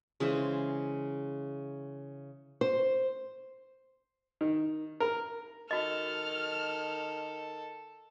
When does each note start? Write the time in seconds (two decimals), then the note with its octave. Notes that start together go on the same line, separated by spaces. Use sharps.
0.20 C#3 E3 G#3 C5
2.61 C5
4.41 D#3
5.00 A#4
5.71 D#3 F#4 A4 D#5 F6